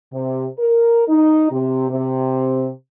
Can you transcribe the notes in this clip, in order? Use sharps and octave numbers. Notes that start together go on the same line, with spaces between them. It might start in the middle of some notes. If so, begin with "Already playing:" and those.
C3
A#4
D#4
C3
C3